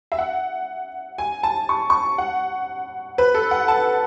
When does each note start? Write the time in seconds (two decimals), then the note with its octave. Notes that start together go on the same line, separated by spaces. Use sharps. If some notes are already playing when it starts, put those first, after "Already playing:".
0.12 E5
0.18 F#5
1.18 G#5
1.43 A5
1.69 C#6
1.90 C#6
2.18 F#5
3.18 B4
3.34 A4
3.51 F#5
3.68 A5